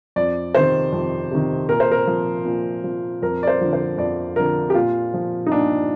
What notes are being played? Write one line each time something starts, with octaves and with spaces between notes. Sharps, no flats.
F2 D5
C3 D#3 C5
F2
C3 D#3
A#2 A#4
C5
A#4
F3
A#2
F3
F2 A#4
D5
C5
D3 F3
C5
F2 D5
D3 F3 A#4
G4
A#2 F4
F3
D#4
A#2 D4